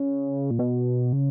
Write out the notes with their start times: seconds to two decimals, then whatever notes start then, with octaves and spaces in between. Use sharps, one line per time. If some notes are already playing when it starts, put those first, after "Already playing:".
Already playing: C#3
0.51 A#2
0.59 B2
1.13 C#3